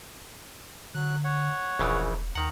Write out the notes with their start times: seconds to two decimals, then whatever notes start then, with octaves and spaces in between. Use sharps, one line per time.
0.95 D3 F#3 F#6
1.24 C#5 F#5
1.79 E1 A#1 C#3 E3
2.35 D#2 D#3 F#5 A#5